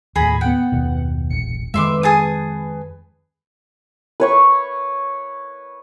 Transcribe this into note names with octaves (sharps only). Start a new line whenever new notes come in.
D#2 A2 G#4 A#5 B5
B3 F#5 G5
F#1 D#2 B2
E1 A#1 C#7
F2 D#3 G#3 B4 E5 C6 D6
G#4 A5 D#6
B4 C#5 C#6